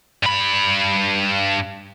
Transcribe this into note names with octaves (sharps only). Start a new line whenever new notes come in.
G2 B5